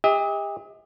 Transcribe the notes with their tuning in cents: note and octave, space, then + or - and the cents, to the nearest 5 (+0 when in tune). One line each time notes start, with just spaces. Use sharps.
G4 +40 D#5 +45